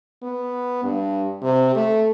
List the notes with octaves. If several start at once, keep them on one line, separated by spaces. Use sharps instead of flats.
B3
G2
C3
A3